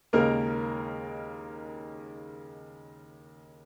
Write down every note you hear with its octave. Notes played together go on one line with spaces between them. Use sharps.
D#2 C#3 G#3 A#3 D#4 A#4